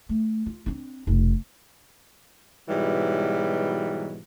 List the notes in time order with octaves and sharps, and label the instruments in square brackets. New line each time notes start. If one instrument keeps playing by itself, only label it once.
[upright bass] A3
F4
C4 D4
F1 B1
[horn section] G#2 B2 E3 F#3 G3